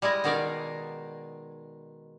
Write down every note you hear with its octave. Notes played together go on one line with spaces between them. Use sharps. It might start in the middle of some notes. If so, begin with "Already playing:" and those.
G3 G#3 E4 D#5
B2 D#3 D#4 D5 F5 G#5